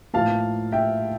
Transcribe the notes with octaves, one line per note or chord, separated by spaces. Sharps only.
A2 F3 A#3 F5 A5
E5 G5